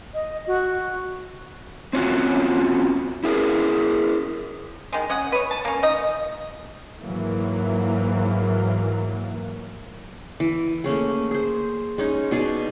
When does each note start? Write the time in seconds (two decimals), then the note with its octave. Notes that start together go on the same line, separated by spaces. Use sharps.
0.14 D#5
0.47 F#4
1.93 C4 C#4 F4 F#4
3.24 E4 G#4 A#4
4.93 D#3 G#3
5.10 C#4 D#5 F#5
5.32 B4 C#5
5.51 A5
5.65 A#3 C#4
5.83 D#4 D#5
7.03 G#2 E3 F#3 A#3
10.40 E3
10.84 A3 A#3 C#4 G#4
11.31 G#4 C5
11.98 G#3 C#4 D#4
12.31 B2 D#4 G#4 D5